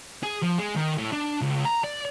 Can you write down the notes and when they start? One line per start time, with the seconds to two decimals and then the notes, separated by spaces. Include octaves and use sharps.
0.23 G#4
0.42 F3
0.58 G#3
0.76 D#3
0.98 A2
1.12 D4
1.41 C#2
1.65 A#5
1.84 D5